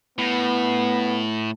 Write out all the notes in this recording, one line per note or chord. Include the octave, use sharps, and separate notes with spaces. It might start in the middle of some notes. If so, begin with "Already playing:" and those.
A2 B3